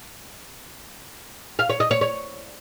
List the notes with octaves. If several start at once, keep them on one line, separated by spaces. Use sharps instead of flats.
F5
C#5
D#5
C#5
C#5